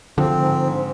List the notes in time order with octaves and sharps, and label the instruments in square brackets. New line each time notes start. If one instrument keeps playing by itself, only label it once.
[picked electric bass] D3 F3 [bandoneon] C4
[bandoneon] G#2
G#2